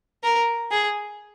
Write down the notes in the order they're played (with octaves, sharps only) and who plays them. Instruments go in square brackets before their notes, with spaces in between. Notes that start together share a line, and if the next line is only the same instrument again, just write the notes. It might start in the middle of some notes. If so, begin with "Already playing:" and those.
[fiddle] A#4
G#4